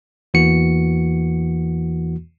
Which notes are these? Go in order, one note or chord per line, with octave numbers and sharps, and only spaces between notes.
E2 E3 A#3 F#4 C#7